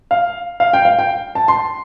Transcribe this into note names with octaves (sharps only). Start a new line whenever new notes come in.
F5
F5
G5
F5
G5
A5
C6